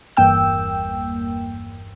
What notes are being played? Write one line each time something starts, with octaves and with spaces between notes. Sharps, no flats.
G1 E2 G2 A#3 G5 E6